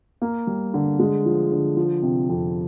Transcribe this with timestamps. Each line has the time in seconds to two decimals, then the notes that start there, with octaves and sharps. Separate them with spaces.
0.21 A#3
0.47 G3
0.74 D3
0.99 G#3
1.26 F3
1.52 D3
1.77 F3
2.02 C3
2.29 F2